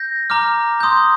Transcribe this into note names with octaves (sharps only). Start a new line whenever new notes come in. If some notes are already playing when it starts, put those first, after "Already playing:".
Already playing: G6 A#6
A#5 D6 F6
C6 D#6 G6